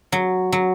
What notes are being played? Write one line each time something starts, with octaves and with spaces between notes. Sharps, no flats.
F#3
F#3